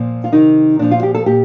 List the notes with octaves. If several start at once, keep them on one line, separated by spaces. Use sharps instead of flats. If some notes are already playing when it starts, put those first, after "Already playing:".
Already playing: A#2 F3
F4
C3 D#3 D#4
A#2 F3 D4
F4
G4
A4
A#2 G4